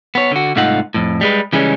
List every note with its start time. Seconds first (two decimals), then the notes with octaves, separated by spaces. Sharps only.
0.15 B3 C#5
0.32 D3 F#4
0.56 C2 G#2 A3 D#4 F4 F#5
0.94 F2 A2
1.21 G3 G#3 B4
1.53 C#3 E3 G3 G#3 C#4